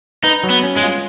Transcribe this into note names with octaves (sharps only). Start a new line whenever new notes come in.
D#4 B4
F#3
B3
C#4
G#3
F4